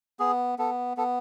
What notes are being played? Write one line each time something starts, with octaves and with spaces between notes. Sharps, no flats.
B3 G#4
B3 A4
B3 A4